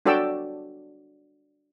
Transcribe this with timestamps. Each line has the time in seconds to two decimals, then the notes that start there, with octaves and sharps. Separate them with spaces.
0.06 D4 F#4 A4 D5 G5 E6